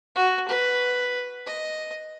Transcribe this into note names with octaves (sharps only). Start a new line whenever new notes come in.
F#4
B4
D#5